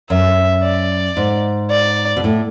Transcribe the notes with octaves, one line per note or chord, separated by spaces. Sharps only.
F#2 E5
D5
G#2
D5
B2
A2